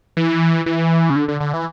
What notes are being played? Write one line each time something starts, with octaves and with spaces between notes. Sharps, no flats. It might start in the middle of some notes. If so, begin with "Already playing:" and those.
E3
E3
C#3
D3
D3
D3
E3